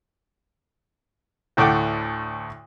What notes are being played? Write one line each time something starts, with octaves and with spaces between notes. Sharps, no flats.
D2 A2 A3 F#5 G5 D6